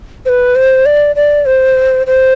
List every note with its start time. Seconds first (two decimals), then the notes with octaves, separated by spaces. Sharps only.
0.26 C5
0.29 B4
0.56 C5
0.86 D5
1.16 D5
1.46 C5
2.07 C5